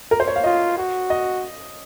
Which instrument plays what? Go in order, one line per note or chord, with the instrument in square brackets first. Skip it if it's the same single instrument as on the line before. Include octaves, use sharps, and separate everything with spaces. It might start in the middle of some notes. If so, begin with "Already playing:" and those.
[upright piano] A#4
C5
C#5
F5
[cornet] F4 [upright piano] D#5
[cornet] F#4
[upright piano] D#5